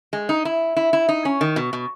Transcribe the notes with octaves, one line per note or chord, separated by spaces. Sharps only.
G#3
D#4
E4
E4
E4
D#4
C#4
D#3
B2
B2